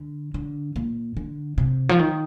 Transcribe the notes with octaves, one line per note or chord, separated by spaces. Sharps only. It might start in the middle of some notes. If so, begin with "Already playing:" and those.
Already playing: D3
D3
A#2
D3
C3
F3
D#3